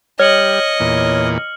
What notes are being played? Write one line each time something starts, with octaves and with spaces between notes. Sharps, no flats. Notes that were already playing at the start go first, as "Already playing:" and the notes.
G3 C#5 D#5 F6 C#7 F#7
E2 A#2